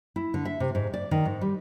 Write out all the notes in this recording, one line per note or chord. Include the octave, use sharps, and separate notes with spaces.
E4
D3
E5
C3
G#2
D5
D#3
G#2
G3